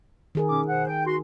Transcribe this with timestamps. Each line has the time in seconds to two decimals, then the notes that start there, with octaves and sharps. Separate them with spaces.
0.35 D#3 G#4 A#4
0.49 B2 C#4 D6
0.67 B2 C5 F#5
0.87 G5
1.06 F#4 C6